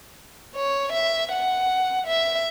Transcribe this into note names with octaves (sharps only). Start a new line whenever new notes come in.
C#5
E5
F#5
E5